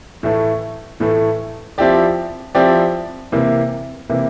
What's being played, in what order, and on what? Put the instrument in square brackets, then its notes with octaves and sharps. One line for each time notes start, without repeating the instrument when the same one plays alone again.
[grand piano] A2 E3 A3
A2 E3 A3
F3 C4 E4 G4 D5
F3 C4 E4 G4 D5
C3 E3 A#3 E4
C3 E3 A#3 E4